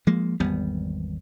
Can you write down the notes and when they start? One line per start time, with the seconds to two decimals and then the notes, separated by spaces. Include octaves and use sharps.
0.07 F3 G#3 A#3
0.40 G#1 E2 G3 B3